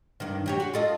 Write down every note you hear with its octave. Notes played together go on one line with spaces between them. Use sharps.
G2 D#3
F#3 G4 C#5
F#4 G#4
F4 A4 D#5